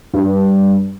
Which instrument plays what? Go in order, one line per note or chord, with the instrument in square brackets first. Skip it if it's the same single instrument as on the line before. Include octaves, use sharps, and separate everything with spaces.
[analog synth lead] G2